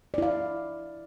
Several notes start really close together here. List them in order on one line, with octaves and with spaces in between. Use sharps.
D5 E4 F5